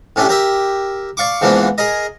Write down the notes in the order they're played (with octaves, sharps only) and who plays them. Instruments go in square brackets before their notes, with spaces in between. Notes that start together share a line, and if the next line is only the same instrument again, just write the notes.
[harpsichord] A2 C#4 D4 E4 G4
G4 A#4 E5
D5 F5 C#6 D6
G#2 E3 F3 A#3 B3 D4
G#4 A#4 D#5